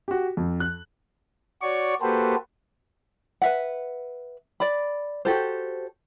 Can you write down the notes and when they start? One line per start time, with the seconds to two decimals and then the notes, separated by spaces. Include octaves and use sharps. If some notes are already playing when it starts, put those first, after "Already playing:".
0.08 F#4 G4
0.37 F2
0.60 F#6
1.62 F#4 C#5 D5 C#6
2.02 A#3 F#4 G4 A4 B4 C5
3.42 B4 E5 F#5
4.60 D5 B5
5.25 F#4 G4 A4 C5